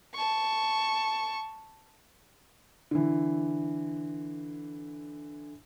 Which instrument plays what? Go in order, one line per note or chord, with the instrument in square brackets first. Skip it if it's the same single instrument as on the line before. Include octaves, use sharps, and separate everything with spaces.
[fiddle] A5 C#6
[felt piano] D3 E3